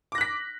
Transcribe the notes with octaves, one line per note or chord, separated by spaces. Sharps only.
D6 F#6 A#6 B6